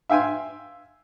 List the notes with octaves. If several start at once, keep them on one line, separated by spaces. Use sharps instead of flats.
E5 F5 G5 G#5 C6